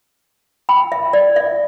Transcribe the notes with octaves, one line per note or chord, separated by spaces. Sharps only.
G5 B5
E5
D5
E5